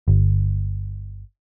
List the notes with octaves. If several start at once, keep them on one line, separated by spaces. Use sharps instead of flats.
G1